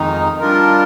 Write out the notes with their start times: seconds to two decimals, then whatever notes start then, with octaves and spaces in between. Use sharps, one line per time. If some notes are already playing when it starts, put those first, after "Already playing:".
Already playing: F2 D#3 G#3 D#4
0.40 G3 D4 F4 A#4